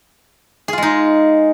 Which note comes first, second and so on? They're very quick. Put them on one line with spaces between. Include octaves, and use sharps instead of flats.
G#4 F4 G#3 D#4